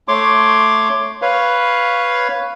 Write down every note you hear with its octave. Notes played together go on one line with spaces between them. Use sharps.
A3 C#5 C6 D6
B4 C#5 F5